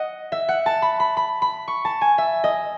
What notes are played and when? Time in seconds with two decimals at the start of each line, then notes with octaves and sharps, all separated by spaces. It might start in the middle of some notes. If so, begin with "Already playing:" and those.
Already playing: D#5 F#5
0.32 E5
0.49 F#5
0.66 A5
0.82 B5
1.00 B5
1.17 B5
1.42 B5
1.68 C#6
1.85 A5
2.01 G#5
2.18 E5
2.44 D#5